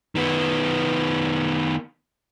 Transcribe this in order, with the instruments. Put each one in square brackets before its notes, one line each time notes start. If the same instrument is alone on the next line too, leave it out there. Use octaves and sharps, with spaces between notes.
[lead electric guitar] D#3 B3